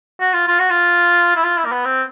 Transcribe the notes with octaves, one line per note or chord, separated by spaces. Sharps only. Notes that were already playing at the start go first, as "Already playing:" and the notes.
F#4
F4
F4
F#4
F4
E4
F4
E4
A#3
B3
C4